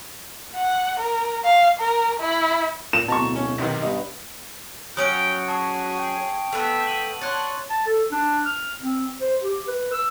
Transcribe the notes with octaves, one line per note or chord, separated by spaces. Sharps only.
F#5
A#4
F5
A#4
E4
A#2 E7
D1 B2 A5 A#5 C#6
C#4
B1 C3 D#3
G2 B3 D#4
F#3 C#4 F#4 G5 D#6 C#7 D7
G#4 A5 C#6
G5
A3 B3 E5
D#7 F#7
D4 C#5 F#5 C6 F#6 A6
A5
A4
D4
F6
C4
C5
G4
B4
E6